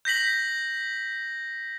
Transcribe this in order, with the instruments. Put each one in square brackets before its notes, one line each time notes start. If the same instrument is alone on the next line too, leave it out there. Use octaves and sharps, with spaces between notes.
[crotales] G6 A#6 B6 F#7